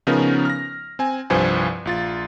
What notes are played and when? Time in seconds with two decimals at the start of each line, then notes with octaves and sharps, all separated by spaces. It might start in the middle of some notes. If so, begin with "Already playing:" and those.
0.07 C#3 F3 B3 C#4 D#4 A#4
0.45 F6 A#6
0.99 C4 G#5
1.30 C2 G2 F3 B4 C5 G#5
1.85 A#1 F4 A6